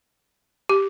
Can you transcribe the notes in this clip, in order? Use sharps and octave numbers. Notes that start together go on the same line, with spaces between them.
G4